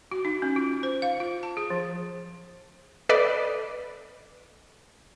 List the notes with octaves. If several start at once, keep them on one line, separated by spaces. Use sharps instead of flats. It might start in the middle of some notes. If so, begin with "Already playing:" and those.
F#4
D#4
C#4
F4
C5
F5
F4
A5
G#4
F3
A4 B4 D5 D#5